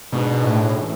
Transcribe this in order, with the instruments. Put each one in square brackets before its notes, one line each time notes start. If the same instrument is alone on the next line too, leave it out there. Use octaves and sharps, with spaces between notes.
[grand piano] G#2 G#3 D4 F#4 [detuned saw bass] B2
[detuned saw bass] A2
[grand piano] E3 A3 C#4